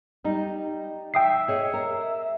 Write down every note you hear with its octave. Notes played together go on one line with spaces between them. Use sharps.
G3 D#4
E5 G5 D#6 C7
G#4 C#5 D#5
A#4